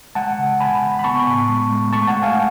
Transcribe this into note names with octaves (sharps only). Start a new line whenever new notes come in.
G#3 F#5 A5
C#3
C#3 G#5 B5
C#3
B5
B3 A5 C#6
A2
G#3
G#3
A3 A5 C#6
F#5 A5
A3
F5 G#5